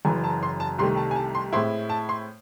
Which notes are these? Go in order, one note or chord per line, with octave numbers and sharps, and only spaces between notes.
F#1 F#2 E3 G#5
A5
C6
A5
C2 C3 D#3 A3 C6
A5
G#5
A5
C6
A2 G#3 C4 E4 C6
A5
C6